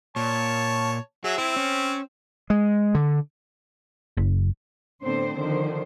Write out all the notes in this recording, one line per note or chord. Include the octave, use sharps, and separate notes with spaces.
A#2 C#5 A5
F#3 G#4 E5
C4 E4
C#4
G#3
D3
F#1
A2 D3 B3 C4 C5
D3 D#3 F3 C5